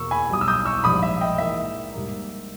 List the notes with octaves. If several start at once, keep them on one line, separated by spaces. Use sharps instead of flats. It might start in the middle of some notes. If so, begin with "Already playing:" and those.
Already playing: E2 B2 A#3 C#6 E6
G#5 B5
B1 B2 G3 D#6
E6
D#6 G6
C#6 E6
A#1 G#2 G3 B5 D#6
E5
D#5 G5
G#2 E3 A#3 E5
G#2 G3 A#3